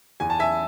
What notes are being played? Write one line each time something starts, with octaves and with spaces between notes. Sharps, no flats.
E2 G#5
A5
E5 G#5